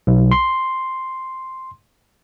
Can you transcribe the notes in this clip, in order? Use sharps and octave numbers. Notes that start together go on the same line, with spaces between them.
B1
C6